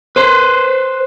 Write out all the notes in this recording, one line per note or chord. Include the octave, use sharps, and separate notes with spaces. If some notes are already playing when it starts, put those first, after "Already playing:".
B4 C5